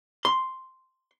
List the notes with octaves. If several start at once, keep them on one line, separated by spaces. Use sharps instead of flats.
C6